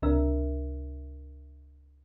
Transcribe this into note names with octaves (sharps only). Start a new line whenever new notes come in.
C#2 C3 D4 A#4 E5